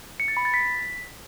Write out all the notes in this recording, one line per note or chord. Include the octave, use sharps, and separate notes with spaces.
C#7
A6
B5
A6
B6